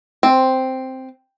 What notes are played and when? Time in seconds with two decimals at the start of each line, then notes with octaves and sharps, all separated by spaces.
0.23 C4